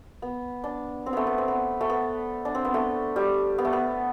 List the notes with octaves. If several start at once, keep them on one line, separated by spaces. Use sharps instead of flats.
B3
D4
C4
A3 B3
B3
C4
B3
A3
B3
D4
C4
B3
A3
G3
B3
A3
B3